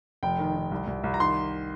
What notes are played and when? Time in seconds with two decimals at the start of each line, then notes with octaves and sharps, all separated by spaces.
0.23 F1 G5
0.39 D#3
0.55 D#3
0.71 C2
0.87 C2
1.04 C2
1.14 A#5
1.20 D#3 C6